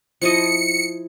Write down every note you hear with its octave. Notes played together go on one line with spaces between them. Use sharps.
F3 E4 D#5 C#7